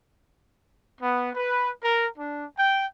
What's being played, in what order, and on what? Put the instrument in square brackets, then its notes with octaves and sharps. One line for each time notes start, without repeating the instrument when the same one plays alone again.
[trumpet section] B3
B4
A#4
D4
G5